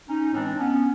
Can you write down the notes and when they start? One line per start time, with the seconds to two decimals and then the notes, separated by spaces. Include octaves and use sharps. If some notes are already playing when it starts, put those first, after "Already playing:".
0.09 C#4 D#4
0.33 A2 E3 G#3 C4 D4
0.59 B3 C#4